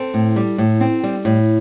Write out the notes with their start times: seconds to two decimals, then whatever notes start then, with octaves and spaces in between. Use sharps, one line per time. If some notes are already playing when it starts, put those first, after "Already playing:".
Already playing: C4 A4
0.14 A2
0.36 G3
0.58 A2
0.81 C4
1.04 G3
1.25 A2